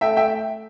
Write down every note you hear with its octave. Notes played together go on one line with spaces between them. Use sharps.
A3 E5 G5
E5 G5